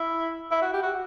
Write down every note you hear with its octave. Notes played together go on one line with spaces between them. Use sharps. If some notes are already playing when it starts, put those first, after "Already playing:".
Already playing: E4
E4
F#4
G4
F#4